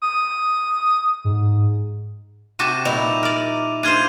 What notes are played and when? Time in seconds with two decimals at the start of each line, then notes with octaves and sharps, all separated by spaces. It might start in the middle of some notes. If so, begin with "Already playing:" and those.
0.02 D#6
1.25 G#2
2.59 C3 F#4 A5 D6 D#7
2.85 A#2 G3 D#4 E4 F7
3.23 A#4 D5
3.83 D4 F4 C5 F6 G#6 D#7